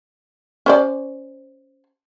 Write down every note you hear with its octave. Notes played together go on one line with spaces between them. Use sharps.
C#4 C5 D5